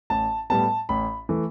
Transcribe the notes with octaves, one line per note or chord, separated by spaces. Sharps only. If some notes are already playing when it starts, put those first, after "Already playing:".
A1 A5
A2 G3 B3 A5
A1 B5
E3 A3